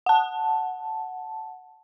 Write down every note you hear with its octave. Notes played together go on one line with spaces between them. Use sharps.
F#5 A5